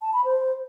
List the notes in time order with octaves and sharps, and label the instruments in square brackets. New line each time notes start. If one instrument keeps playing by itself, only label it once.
[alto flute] A5
B5
C5